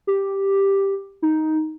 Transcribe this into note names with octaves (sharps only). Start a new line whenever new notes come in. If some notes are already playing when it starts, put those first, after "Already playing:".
G4
D#4